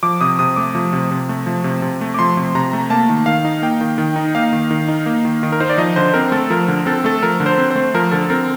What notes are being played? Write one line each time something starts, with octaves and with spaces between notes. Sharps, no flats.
F3 D6
C3 D#6
C3 D#6
A3 D6
F3
C3
C3
A3
F3
C3
C3
A3
D6
F3 C6
C3
C3 A#5
A3
A#3 A5
D#3
D#3 F5
D#4
A#3 G5
D#3
D#3
D#4
A#3 F5
D#3
D#3
D#4
A#3
D#3
D#3
A#4
D#4 C5
D5
F3 D#5
D3 C5
C4 A#4
A3 A4
F3 A#4
D3
C4 A4
A3 A4
F3 A#4
D3
C5
C4
A3 C5
F3 A#4
D3 A4
C4 A#4